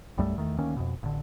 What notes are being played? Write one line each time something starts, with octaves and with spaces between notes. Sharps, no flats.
B1 F#2 G3 A3
E2 D#3 A3
D2 D#3 A#3 C#4
F2 B2
A1 D3